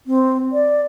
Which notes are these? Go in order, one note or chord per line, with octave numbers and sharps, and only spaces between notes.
C4
D5